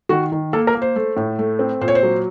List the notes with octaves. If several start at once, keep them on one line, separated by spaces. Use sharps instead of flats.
D#3 F#4
D#3
A#3 A4
A#4
A#3
C5
A3
A2
A3
C4
A#2 C5
C#5
C5
F#3